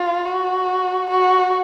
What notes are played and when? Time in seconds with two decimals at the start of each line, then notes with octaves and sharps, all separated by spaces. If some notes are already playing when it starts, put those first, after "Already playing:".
Already playing: F4
0.25 F#4
1.10 F#4